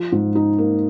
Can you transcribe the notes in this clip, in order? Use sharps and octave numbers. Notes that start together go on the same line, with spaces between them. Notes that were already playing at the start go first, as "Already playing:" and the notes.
Already playing: F3
G#2
D#4
A#3